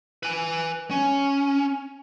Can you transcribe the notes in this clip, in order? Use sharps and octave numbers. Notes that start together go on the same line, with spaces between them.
B4 G#5
C#4